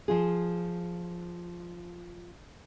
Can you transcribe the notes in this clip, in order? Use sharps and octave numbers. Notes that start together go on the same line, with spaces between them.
F3 F4 G#4